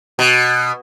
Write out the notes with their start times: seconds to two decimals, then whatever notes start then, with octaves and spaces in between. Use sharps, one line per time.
0.19 B2